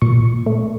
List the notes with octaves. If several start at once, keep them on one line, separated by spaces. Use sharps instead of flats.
A#2 C#6
A3